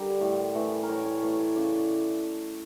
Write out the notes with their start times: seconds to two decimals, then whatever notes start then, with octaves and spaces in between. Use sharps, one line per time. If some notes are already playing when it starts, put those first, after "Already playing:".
Already playing: D3 G3 A#4
0.21 A2
0.55 E3 A3
0.83 A#4
0.89 A2 C#5
1.05 C#5
1.22 E3 A3 D5
1.39 C#5
1.56 C#3 D5